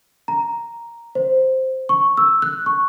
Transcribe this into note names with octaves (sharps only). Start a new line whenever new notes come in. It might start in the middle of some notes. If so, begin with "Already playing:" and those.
A#5
C5
C#6
E6
F#6
C#6